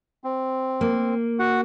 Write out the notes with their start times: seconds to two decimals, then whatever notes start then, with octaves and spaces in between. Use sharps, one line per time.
0.24 C4
0.81 A#3
1.39 F#4 F#5